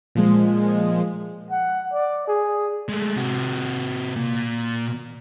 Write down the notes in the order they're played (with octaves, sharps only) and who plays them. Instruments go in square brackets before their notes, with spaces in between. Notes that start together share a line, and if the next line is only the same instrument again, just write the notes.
[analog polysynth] A#2 F3 G#3
[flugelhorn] F#5
D5
G#4
[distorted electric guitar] G#3 A3
C3 F#4
A#2